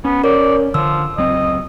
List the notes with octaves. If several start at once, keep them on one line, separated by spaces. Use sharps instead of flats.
B3 C#4
A#4 C#5 D5
D3 F3 E6
C#2 F#3 C4 D#5